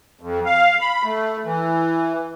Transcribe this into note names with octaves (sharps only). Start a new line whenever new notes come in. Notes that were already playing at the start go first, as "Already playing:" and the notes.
F2
F5
B5
A3
E3